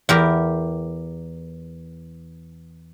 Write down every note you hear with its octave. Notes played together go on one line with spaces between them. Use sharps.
E2 G4 A#4